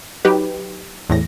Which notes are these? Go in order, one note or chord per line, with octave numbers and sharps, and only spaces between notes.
F#3 D#4 G4 B4
E2 A2 A#6